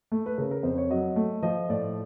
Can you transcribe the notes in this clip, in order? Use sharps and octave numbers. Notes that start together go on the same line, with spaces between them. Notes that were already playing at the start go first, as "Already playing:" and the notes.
A3
B4
C#3 A#4
A#4
F2 C5
C#5
F#3 D#5
A3
F3 D#5
A2 D5